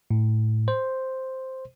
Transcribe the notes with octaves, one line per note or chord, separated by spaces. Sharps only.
A2
C5